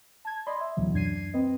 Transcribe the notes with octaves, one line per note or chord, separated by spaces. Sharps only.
A5 G#6
D5 D#5 B5 C6
E5
D2 B2 E3 F#3
F#2 D4 G#6 C7 D#7
C4 B4 D#5